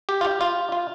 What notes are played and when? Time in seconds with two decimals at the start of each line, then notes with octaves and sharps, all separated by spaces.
0.09 G4
0.21 F4
0.25 G4
0.41 F4
0.72 F4